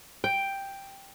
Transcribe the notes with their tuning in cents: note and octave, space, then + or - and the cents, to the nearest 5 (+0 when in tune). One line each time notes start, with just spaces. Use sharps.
G5 +5